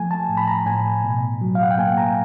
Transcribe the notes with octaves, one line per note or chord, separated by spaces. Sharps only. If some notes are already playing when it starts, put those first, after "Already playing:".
Already playing: F3 A3 G#5
A5
A2
B5
A#5
A2 G#5
B2
F#3
F5
F#5
G5
A#3 G#5
A#5